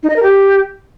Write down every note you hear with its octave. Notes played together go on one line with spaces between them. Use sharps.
D#4
D#5
A#4
G4